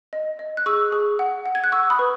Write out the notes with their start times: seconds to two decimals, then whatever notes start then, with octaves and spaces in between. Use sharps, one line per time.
0.13 D#5
0.39 D#5
0.57 F#6
0.66 G#4 C#6 E6
0.92 G#4
1.19 F#5
1.46 F#5
1.55 G#6
1.64 F#6
1.72 F#5 C#6 E6
1.90 B5 D#6
1.99 B4